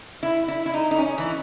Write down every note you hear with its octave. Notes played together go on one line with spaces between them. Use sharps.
E4
E4
E4
D#4
D#4
C#4
E3